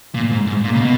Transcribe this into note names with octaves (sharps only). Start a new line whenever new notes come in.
A#2
G#2
G#2
A#2
C#3
B2